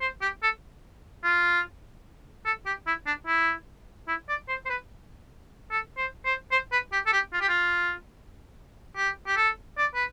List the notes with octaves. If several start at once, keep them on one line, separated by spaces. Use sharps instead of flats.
C5
G4
A4
F4
A4
G4
E4
D4
E4
E4
D5
C5
C5
B4
A4
C5
C5
C5
B4
G4
A4
G4
F4
G4
F4
G4
G4
A4
D5
B4